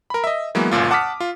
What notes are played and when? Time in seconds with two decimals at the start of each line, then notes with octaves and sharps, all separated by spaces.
0.10 A#4 B5
0.24 D#5 E5
0.55 E3 F#3 G#3 A#3 B3
0.71 G1 C#2 F#2 A#2 F4
0.91 F#5 A5 D6 D#6 F6 B6
1.20 F4